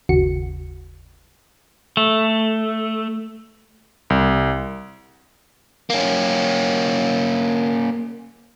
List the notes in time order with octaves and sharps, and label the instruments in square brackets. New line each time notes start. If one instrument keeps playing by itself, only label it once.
[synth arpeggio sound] G1 D#2 C#3 F#4 C#7
[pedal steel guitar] A3
[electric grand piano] C2
[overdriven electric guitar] A#3 C#4